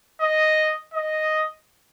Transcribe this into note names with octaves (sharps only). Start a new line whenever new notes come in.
D#5
D#5